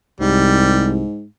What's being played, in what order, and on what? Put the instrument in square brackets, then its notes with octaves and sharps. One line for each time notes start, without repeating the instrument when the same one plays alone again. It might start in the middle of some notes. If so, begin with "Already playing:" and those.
[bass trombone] C2 [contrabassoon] G#2 [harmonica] G3